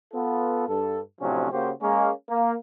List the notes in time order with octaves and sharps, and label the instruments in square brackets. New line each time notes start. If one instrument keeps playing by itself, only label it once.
[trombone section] B3 F4 A4
G2 A4
A2 C3 F3 F#3 C#4 D4
C#3 A#3 F#4 G4 C5
G#3 A#3 C#4
A#3